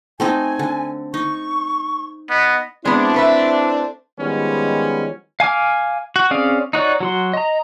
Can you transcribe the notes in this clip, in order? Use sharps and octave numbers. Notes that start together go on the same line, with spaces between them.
A3 C4 D#4 G#5
D3
D#4 C#6
B3 D#5
G#3 B3 C4 D4 E4
A3 B4 E5
D#3 F3 G3 G#3 B3 C#4
F5 G#5 D6 F6
F#4
C4 C#4 G#4 D5 F5
D#4 F#4 C#5 D5
F#3 F#4 C6
D#5 A#5